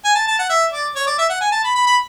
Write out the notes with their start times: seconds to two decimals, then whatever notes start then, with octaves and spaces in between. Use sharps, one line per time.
0.05 G#5
0.15 A5
0.28 A5
0.39 F#5
0.49 E5
0.72 D5
0.96 C#5
1.07 D5
1.18 E5
1.29 F#5
1.41 G#5
1.52 A5
1.64 B5
1.75 B5
1.87 B5